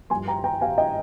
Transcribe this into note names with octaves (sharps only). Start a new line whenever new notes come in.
G2 F3 G#5 C6
G5 A#5
G5 A#5
F5 G#5
D#5 G5